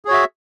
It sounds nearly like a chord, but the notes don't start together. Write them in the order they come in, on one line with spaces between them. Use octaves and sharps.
G#4 C#5 F#4 E5